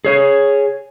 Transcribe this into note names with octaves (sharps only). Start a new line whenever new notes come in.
G#4 C#5